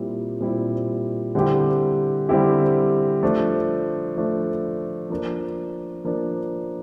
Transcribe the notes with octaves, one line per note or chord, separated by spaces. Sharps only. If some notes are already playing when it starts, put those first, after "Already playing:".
Already playing: A#2 G3 C4 E4
A#2 G3 C4 E4
D3 G3 C4 E4 G4
D3 G3 C4 E4 G4
F3 A3 D4
F3 A3 D4
F3 A#3 D4
F3 A#3 D4